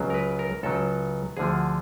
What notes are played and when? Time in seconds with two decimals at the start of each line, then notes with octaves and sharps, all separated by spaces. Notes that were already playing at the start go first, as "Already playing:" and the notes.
Already playing: C#2 C#3 F#3
0.10 A#4
0.14 B4
0.39 A#4
0.63 C#2 C#3 F#3 A4
1.37 D2 D3 F3 G#4